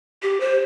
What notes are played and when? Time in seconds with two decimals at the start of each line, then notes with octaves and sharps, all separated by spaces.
0.22 G4
0.40 C5